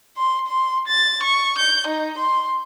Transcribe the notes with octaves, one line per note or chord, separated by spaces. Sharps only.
C6
C6
A6
C#6
G6
D#4
C6